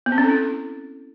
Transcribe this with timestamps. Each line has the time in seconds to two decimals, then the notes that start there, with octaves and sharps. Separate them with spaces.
0.06 B3
0.12 C4
0.18 C#4
0.24 A4
0.30 E4